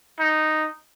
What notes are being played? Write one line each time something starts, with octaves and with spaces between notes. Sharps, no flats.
D#4